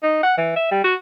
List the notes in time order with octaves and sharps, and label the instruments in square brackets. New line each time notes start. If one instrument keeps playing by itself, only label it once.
[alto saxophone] D#4
F#5
E3
E5
G3
F#4